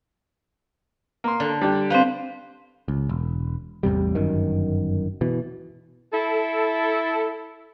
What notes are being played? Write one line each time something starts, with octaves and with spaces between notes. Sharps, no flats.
A#3 C6
D3
G3 D4 G4
C4 B4 C5 F5
C#2
E1
A1 E2 C3 G3
G1 F#2 D#3
B2 E3
E4 A4